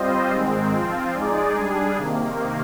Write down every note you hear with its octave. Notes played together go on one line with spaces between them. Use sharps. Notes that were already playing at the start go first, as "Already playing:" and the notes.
Already playing: G3 C4 F4 C5 D#5
G#2 D#3 G#3 C4
F3 C4 F4
G#3 D#4 G#4 D5
G3 D4 G#4
C3 D#3 A#3